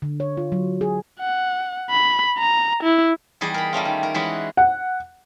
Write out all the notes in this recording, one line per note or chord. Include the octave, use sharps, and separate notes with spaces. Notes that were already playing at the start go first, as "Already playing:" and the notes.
D3
C#5
F4
F#3
G#4
F#5
B5
A#5
E4
E2 G3 G#4 D#5
A#4 B5
G3 A3 C#4 F4
D#3
A#4
E3 G#3 C#4 F#4 G#4 B4
F#5